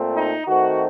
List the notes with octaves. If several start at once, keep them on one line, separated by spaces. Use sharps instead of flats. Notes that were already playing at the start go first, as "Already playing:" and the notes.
Already playing: A#2 A3 C4
D#4
D#3 A3 C4 F#4